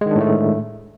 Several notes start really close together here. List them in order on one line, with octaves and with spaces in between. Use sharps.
G#3 D#3 D4 A2 A3